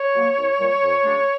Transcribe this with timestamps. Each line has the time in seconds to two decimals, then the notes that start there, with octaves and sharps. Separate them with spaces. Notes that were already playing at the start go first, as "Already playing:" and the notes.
Already playing: C#5
0.14 F#3 A#3
0.37 C2
0.59 A#2 G3
0.83 F2
1.04 C#3 F#3 A3 D4